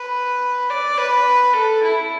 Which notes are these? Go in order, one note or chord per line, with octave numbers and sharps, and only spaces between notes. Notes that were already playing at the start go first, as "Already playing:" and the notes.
Already playing: B4
D5
B4
A4
E4